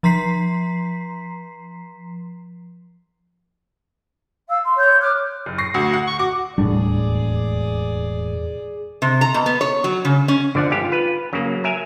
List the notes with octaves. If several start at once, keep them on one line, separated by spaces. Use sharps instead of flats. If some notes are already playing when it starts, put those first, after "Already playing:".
F3 A#5 C6 B6 C7
F5 E6
C6
C#5 G6
D6 F6 F#6
F#1
C#6 A#6 C7
D2 F#4
F#5
C#6
F#4 D6
E1 D#2 A2 G3 D4 G#4 D5
C3
A#5
B2
B3
C#5
F#3
C#3
C#4
D3 F3 D5 F#5
G1 G#2 F4 G4
B4
C#3 F#3 A#3
A#4 E5 G#5